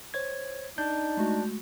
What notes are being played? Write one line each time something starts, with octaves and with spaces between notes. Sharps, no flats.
C5 C#5 G#6
D4 D#4 G6
G#3 A3 F#4